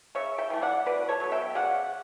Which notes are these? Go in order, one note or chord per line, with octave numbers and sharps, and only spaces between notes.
C#3 C#5 E5
E5 G5
E3 A3
D5 F#5
B2 B4 D5
A4 C#5
F#3 B3
E5 G5
C#3 D5 F#5